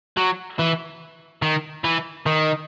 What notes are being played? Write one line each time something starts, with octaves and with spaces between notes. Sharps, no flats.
F#3
E3
D#3
E3
D#3